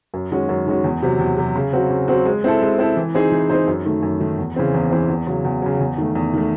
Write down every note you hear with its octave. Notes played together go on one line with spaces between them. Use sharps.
F#2
D#3 G#3 C#4 F#4
F#2
D#3 G#3 C#4 F#4
E2
C3 F#3
E2
C3 F#3
C#3
F#3 C4 F#4
C#3
F#3 C4 F#4
G#3
C4 E4 A4
G#3
C4 E4 A4
E3
C4 D#4 G#4 C5
E3
C4 D#4 G#4 C5
F#2
D#3 A3
F#2
D#3 A3
E2
C#3 E3 C4
E2
C#3 E3 C4
E2
C#3 F#3
E2
C#3 F#3
E2
D#3 A3
E2
D#3 A3